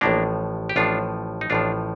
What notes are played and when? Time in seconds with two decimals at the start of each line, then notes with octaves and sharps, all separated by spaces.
0.01 A1 A2 F3 A#3 D4
0.69 G4
0.76 A1 A2 F3 D4 F4
1.41 D#4
1.50 A1 A2 F3 D4 F4